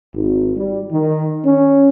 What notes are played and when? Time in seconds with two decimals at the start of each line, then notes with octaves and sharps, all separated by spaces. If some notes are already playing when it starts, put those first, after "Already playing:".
0.14 G#1
0.57 G3
0.91 D#3
1.44 C#4